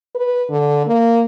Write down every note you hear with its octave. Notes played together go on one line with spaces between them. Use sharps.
B4
D3
A#3